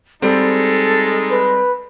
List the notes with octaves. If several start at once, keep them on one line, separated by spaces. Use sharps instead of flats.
G3 G#3 C4 D#4 A4
B4